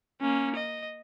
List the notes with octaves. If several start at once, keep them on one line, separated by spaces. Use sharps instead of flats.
A#3 C#4
D#5